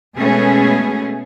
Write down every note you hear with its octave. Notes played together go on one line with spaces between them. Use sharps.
B2 G#3 A3 B3 C#4 G#4